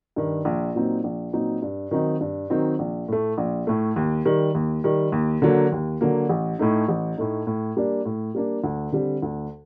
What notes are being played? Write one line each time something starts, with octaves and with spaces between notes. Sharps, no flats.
G2 D#3
A#1
A#2 F#3 C4 D#4
A#1
A#2 F#3 C4 D#4
G2
D#3 F#3 C4 D#4
G2
D#3 F#3 C4 D#4
A#1
A2 A3
A#1
A2 A3
D#2
D#3 G3
D#2
D#3 G3
D#2
D3 F#3 A#3
D#2
D3 F#3 A#3
A1
A2 A3 D#4
A1
A2 A3 D#4
A2
G3 A#3 D4
A2
G3 A#3 D4
D2
D3 G3 C4
D2